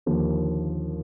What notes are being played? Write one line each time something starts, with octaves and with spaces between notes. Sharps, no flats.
D#2 D3 F3 A#3